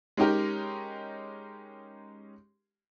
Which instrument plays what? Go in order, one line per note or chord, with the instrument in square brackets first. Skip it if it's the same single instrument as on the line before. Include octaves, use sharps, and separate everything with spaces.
[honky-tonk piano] G#3 C#4 D#4 G4 A#4